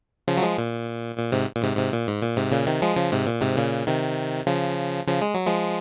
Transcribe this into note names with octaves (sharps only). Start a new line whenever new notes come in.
C#3 F3
F#3
F3 G#3
A#2
A#2
G#2 C3
A#2
G#2 C3
G#2 C3
A#2
G#2
A#2
G#2 C3
A#2 C#3
C3 D#3
F3 G#3
C#3 F3
G#2 C3
A#2
G#2 C3
A#2 C#3
C3 D#3
C#3 F3
C#3 F3
G#3
F#3
F3 G#3